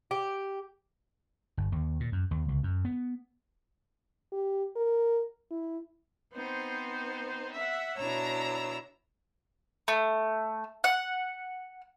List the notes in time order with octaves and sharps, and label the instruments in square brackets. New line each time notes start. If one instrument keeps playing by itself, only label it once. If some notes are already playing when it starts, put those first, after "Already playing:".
[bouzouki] G4
[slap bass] G1
D#2
A#2
F#2
D#2
C#2
F#2
B3
[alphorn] G4
A#4
E4
[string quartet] B3 C4 D#4 C5
E5 F#5
B2 D4 E4 C#5 A#5 E6
[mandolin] A3
F#5